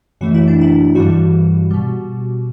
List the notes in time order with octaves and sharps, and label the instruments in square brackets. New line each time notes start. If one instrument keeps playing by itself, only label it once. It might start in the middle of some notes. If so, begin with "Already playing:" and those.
[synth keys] F#2 E3 A3 F#4
E4
D4
E4
G2 E3 G3 F#4
B2 G3